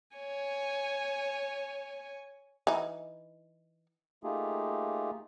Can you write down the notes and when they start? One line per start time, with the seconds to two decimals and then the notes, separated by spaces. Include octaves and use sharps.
0.16 C#5 G#5
2.67 E3 D#4
4.24 A3 A#3 D#4 F4 G4 G#4